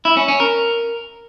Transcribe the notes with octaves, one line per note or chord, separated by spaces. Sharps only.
E4
C#4
C#4
A#4